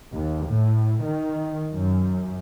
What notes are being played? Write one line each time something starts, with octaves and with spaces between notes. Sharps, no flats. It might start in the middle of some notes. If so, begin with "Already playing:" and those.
D#2
A2
D#3
F#2